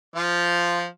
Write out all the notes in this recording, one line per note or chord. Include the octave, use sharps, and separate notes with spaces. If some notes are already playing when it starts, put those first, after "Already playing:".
F3 F4